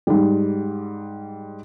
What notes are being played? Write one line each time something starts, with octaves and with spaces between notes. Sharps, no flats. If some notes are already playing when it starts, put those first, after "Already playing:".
G#2 G3